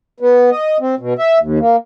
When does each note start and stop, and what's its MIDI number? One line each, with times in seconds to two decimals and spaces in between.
0.20 0.50 59
0.51 0.77 75
0.80 0.95 60
0.99 1.14 47
1.19 1.39 76
1.40 1.59 39
1.59 1.76 58